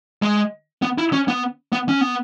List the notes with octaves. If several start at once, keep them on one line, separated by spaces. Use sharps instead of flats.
G#3
B3
E4
C#4
B3
B3
C#4
B3